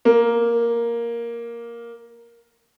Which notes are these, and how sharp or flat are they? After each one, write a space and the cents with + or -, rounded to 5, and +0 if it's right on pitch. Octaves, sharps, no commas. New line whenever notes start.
A#3 +5